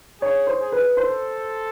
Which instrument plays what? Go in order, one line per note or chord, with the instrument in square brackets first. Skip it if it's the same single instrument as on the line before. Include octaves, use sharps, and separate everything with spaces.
[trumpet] G#4 [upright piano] C#5
[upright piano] C5
[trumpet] G#4
[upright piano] B4
[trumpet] A4 [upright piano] C5